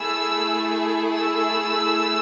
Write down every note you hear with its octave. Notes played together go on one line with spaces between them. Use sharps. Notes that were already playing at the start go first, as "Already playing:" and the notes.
Already playing: A3 E4 G#4 E6
E6